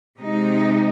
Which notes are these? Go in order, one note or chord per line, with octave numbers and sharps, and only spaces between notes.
C3 G#3 D#4